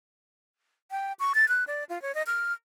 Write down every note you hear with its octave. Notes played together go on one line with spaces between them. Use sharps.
G5
C#6
A6
F#6
D5
F4
C#5
D#5
F6